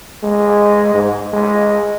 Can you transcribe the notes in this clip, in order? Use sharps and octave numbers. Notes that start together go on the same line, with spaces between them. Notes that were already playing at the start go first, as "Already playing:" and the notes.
G#3
G#2
G#3